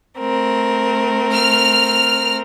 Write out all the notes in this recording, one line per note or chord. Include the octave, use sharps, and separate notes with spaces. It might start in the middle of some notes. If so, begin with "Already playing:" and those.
A3 C4 A#4
F6